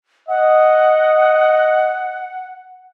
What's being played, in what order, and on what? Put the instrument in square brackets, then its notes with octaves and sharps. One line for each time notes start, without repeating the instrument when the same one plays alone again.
[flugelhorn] D#5 [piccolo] F#5